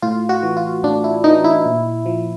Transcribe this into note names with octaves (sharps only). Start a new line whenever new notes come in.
A2 F4
F#4
E3
F4
A2 D4
E4
E3 D#4
E4
A#2
F3